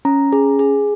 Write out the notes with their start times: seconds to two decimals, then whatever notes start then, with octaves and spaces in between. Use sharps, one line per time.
0.05 C#4 A#5
0.33 G#4
0.59 G#4